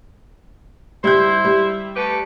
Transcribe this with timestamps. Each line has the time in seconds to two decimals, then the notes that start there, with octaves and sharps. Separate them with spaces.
1.04 G3 E4 C5 E5 G6
1.45 G3
1.96 A3 G4 B4